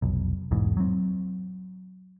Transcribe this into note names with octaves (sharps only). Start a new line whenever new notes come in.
F1 B1
B1 E2 G#2 E3
F#3 C4